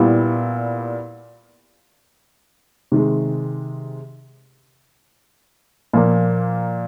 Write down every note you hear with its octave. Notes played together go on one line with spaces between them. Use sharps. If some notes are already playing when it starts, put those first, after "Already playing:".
Already playing: A#2 G3 B3 E4
C3 D#3 G#3
A#2 F3 A#3